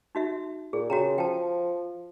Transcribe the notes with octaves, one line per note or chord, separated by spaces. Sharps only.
D#4 F#4 E5
A#2 G#4
C#3 F#4 G5 A#5
F3 G5 A5